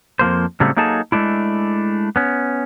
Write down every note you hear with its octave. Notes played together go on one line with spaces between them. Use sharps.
F2 F3 A#3 C5
A2 C#3 F#3 G3 A3 C4
F#3 A#3 D#4 G#4 A4 A5
G#3 A3 D4 E4
B3 C#4